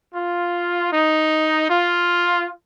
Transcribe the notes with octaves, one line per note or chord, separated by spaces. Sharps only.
F4
D#4
F4